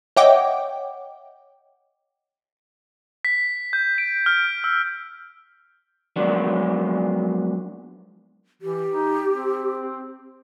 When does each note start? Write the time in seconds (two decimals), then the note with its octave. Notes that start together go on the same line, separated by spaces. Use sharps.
0.16 C#5 D#5 E5 F#5 G5 D6
3.25 B6
3.73 G6
3.98 D7
4.26 F6
4.64 E6
6.16 F3 F#3 G#3 A#3 B3 D4
8.62 E3 G4
8.91 D#4
9.33 C4